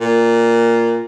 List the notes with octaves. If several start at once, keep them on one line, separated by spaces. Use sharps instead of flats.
A#2